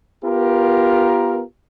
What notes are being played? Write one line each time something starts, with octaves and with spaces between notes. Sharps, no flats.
B3 F4 G4 A#4